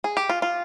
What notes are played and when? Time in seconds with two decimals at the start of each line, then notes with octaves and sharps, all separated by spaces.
0.04 G#4
0.17 G4
0.29 F4
0.42 F4